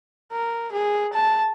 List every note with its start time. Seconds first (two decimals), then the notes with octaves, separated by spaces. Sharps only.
0.31 A#4
0.72 G#4
1.13 A5